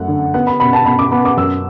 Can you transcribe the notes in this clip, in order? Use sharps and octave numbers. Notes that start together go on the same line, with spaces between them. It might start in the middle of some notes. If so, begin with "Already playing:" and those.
Already playing: F#2 A3 F#5
D3
B3 F#5
B5
B2 B5
A5
B2 B5
D6
B3 B5
D6
F#2 E6